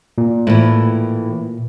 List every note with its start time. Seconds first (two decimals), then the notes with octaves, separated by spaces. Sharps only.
0.18 A#2
0.47 A2 E3